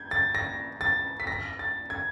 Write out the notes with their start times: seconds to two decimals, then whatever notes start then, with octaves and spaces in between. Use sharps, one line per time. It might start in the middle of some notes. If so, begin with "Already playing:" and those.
Already playing: G6 G#6
0.11 A6
0.35 A#6
0.81 A6
1.20 B6
1.27 A#6
1.59 A6
1.90 G#6